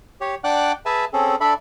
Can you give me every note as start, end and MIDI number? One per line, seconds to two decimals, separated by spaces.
0.21 0.35 67
0.21 0.35 73
0.44 0.72 62
0.44 0.72 74
0.44 0.72 78
0.44 0.72 79
0.44 0.72 86
0.44 0.72 90
0.86 1.05 68
0.86 1.05 71
0.86 1.05 76
0.86 1.05 80
0.86 1.05 81
1.13 1.36 60
1.13 1.36 61
1.13 1.36 68
1.13 1.36 69
1.41 1.54 62
1.41 1.54 69
1.41 1.54 74
1.41 1.54 76
1.41 1.54 83